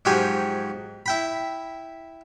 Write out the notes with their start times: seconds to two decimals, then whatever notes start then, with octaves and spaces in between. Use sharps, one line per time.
0.05 G#2 F3 F#3 G4 G#5
1.06 E4 G5 B5